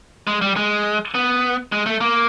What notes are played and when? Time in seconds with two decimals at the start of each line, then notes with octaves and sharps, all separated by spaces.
0.27 G#3
0.42 G3
0.56 G#3
1.15 B3
1.72 G#3
1.86 A3
2.01 A#3